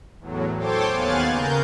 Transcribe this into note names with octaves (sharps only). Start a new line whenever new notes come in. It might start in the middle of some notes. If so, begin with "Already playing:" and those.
E2 A2 F#3
A4 C5 C#5 G5 C6 D6
D#2 B3 F5 G#5 F#6 A6
C#3 A#4 G6